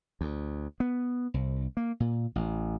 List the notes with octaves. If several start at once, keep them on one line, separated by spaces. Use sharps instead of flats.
D2
B3
C2
A#3
A#2
A1